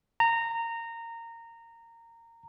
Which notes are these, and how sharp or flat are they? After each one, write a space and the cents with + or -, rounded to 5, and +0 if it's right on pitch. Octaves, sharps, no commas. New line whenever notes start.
A#5 -20